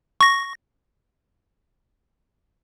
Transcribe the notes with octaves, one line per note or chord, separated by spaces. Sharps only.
C#6 A#6